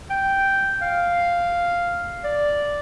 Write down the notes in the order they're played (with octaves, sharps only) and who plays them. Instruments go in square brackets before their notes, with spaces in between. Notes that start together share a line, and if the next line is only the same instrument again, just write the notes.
[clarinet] G5
F5
D5